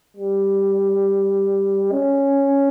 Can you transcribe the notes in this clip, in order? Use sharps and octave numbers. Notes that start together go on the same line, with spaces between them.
G3
C#4